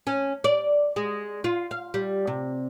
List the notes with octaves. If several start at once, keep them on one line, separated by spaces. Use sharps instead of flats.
C#4
D5
G#3
F4
F5
G3
C3